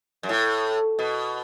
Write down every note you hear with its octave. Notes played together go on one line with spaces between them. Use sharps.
F#2
A2
B2